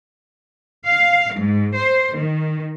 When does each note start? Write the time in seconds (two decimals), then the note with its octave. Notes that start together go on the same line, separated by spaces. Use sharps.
0.87 F5
1.36 G#2
1.77 C5
2.17 D#3